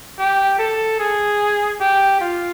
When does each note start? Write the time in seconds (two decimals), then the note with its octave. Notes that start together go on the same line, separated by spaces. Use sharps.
0.19 G4
0.59 A4
0.99 G#4
1.81 G4
2.21 F4